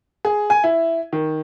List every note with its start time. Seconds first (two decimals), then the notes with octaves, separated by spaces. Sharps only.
0.25 G#4
0.50 G#5
0.64 E4
1.12 D#3